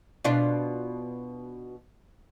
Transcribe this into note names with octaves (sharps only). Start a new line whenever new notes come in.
B2 D4 F4